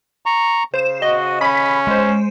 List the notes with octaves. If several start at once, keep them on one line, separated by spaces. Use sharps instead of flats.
A#5 C#6
C#3 C5 E7
F#4 D#5
C#4 B5 B6
G#3 C5